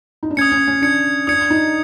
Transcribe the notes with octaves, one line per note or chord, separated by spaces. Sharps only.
D#4
D4
C#4 D#6 G#6 C#7
C#4
C#4
D4 D#6 G#6 C#7
D4 D#6 G#6 C#7
D#4